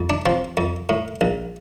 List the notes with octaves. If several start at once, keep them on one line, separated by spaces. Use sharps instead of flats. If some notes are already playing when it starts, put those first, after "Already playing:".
Already playing: F2
D4
F3 C4
F2
A2
A#1